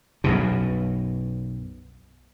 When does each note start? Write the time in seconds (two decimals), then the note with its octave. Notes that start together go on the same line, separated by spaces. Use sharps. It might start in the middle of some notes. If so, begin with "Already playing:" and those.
0.24 B1 F#2 B2